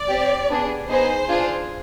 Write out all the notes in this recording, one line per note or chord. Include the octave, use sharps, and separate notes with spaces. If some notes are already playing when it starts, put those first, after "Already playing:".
Already playing: D5
C4 G4
B3 D4 G#4
B3 D#4 G#4 C5
D4 F4 G#4